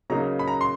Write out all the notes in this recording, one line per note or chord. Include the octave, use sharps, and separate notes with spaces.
C#3 F#3 A#3 D#4 A#5
B5
A#5
C6